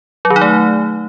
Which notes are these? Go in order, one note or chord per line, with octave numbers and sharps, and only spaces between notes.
F#3
D#3
D#4
A3